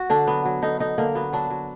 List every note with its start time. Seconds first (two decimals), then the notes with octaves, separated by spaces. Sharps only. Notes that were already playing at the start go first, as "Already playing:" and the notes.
Already playing: F#4
0.10 D3 D4
0.27 F#3 B3
0.46 F#3
0.62 D3 D#4
0.80 D3 D#4
0.98 D3 A#3
1.15 F#3 B3
1.33 F#3 D4
1.50 F#3